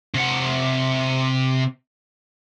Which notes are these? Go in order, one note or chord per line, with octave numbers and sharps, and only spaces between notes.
C3 F#5